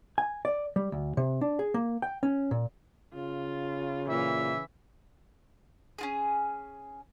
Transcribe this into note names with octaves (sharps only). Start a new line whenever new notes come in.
G#5
D5
G3
D2
C3
D4
G#4
A#3
G5
C#4
A#2
C#3 F4
A#2 E3 E5
C#4 F4 G#4